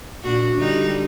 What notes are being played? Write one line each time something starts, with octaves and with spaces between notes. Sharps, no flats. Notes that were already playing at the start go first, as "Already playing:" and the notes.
A#2 D4 F#4
D3 G3 D#4